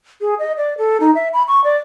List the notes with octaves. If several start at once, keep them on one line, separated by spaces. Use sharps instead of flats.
G#4
D#5
D5
A4
D#4
E5
B5
C#6
D5